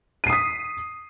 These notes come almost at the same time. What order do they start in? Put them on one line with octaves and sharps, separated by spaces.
D#7 C7 D#6 B6